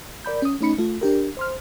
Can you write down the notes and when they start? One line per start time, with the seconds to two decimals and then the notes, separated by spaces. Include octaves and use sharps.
0.25 A#4 D5 B5 G6
0.42 C#4 D#6
0.61 A3 C#4 D#4 B5 C#7
0.78 A3 F4
1.01 D4 G4 A#4
1.37 C5 C6 F6